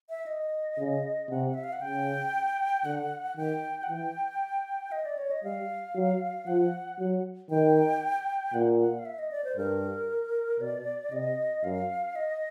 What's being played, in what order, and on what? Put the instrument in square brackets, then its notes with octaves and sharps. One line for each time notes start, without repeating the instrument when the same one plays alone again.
[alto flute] E5
D#5
[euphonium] C#3
[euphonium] C3 [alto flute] F#5
[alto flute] E5
F5
F#5
[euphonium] C#3 [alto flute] G5
[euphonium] D3 [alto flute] F#5
[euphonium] D#3 [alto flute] G5
[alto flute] F#5
[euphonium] E3 [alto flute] G5
[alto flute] D#5
D5
C#5
D#5
[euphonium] G3 [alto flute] F5
[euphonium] F#3
[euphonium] F3 [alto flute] F#5
[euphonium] F#3
[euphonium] D#3 [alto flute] G5
[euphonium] A#2 [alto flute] F#5
[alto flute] F#5
F5
E5
D#5
D5
C5
[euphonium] G2 [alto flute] A#4
[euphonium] B2 [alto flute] D5
[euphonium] C3 [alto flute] D#5
[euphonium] F#2 [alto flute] F5
[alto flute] D#5